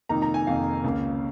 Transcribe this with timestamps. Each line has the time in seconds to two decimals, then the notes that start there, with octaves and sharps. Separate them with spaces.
0.09 F1 F2 D#3 A#3 D#4 A#5
0.22 A#5
0.34 G#5
0.47 F1 F2 D#3 A#3 D#4 F5
0.84 C#2 C#3 A#3